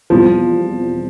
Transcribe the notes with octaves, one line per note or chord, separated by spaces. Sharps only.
E2 B2 F3 G3 C4 F4